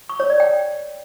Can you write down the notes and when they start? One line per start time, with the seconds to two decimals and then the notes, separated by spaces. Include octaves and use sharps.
0.09 C#6
0.20 C#5
0.30 D5
0.40 G5